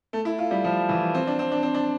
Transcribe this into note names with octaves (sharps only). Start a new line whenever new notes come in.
A3
E4
F4
G3
F3
E3
C4
D4
C4
D4
C4
D4